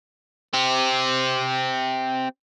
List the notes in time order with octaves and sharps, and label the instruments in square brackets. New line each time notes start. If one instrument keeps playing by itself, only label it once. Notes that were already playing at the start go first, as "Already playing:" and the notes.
[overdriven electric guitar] C4 G4